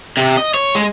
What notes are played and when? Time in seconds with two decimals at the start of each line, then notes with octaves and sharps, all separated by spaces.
0.17 C3
0.37 D#5
0.54 C#5
0.75 G#3